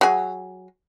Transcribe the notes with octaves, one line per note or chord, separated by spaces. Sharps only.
F#3 G#4